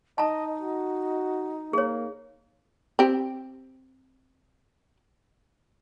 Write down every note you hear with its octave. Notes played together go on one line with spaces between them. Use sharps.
D#4 D#5 A5 A#5
F#4
A#3 G#4 C#5
C4 G4